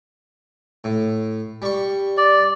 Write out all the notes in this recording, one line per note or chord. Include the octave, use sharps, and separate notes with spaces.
A2
G3 C#6
D5